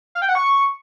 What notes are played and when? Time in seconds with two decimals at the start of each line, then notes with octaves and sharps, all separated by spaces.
0.15 F5
0.22 G5
0.28 F#5
0.35 C#6